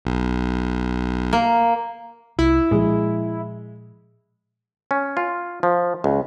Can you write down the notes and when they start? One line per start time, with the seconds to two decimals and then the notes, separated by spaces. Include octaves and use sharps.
0.05 B1
1.33 A#3
2.39 C2 E4
2.71 A#2 F3 G#3
4.91 C#4
5.17 F4
5.63 F3
6.04 C#2